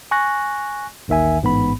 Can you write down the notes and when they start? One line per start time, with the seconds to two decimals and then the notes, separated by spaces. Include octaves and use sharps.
0.11 G#5 C#6 F#6 A#6
1.08 A1 D#2 D#3 E5 G#5
1.42 A1 G#2 B3 B5